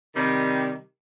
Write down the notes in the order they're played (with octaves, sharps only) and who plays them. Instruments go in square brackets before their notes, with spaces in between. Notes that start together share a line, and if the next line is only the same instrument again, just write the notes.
[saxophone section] C3 D#3 G3